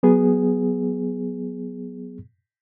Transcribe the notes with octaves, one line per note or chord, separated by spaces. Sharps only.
F#3 B3 G#4